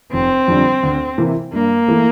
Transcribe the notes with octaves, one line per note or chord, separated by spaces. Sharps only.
F1 C4
F2 D3 G3
D2
C3 E3 A#3
G2 A#3
E3 A3